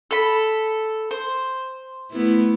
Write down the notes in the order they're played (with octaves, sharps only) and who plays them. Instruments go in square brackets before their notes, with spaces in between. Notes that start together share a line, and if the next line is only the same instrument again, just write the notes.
[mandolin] A4 B5
C5
[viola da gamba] A3 B3 E4